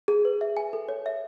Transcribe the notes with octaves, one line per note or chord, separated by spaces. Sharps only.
G#4
B4
E5
G#5
A4
C#5
E5